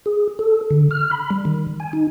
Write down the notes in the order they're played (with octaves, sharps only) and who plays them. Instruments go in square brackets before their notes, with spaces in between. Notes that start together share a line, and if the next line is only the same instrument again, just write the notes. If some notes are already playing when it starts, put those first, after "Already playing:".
[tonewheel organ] G#4
A4
D3
F6
B5
G3
D#3
G#5
D#4